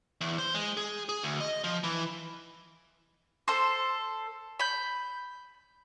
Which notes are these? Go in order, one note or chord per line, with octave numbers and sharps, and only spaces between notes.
E2
C5
G#3
G#4
G#4
D2
D#5
F3
E3
A4 C5
B5 G6